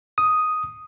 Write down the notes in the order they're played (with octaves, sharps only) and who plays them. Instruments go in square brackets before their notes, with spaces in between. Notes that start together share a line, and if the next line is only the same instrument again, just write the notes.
[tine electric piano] D#6